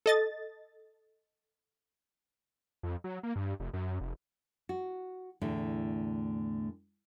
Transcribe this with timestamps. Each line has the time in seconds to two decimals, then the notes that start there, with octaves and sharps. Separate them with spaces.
0.06 A4 D#5 A6
2.83 F2
3.04 F#3
3.23 A#3
3.36 G2
3.60 F1
3.73 F#2
4.01 F1
4.69 F#4
5.41 E2 A2 D3 A3